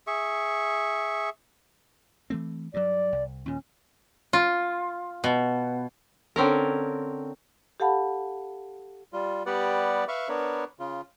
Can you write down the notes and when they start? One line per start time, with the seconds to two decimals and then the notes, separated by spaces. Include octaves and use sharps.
0.07 G#4 E5 C#6
2.30 E3 A3 C4
2.74 G2 F#3 D5
3.12 C2
3.46 D#2 A#2 C#4
4.33 F4
5.24 B2
6.36 D3 C4 C#4 A#4
7.80 G4 A4 F5 F#5 A5 B5
9.13 G3 F4
9.46 G3 B3 G4 B4 D5 F#5
10.08 B4 E5 F5 B5 C#6
10.29 B3 D4 A#4 B4 C#5
10.79 C#3 F4